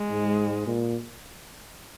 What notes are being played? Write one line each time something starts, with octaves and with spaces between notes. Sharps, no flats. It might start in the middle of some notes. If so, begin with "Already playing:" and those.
Already playing: G#3
G#2
A#2